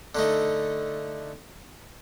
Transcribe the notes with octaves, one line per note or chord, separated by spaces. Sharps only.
D3 A3 D#4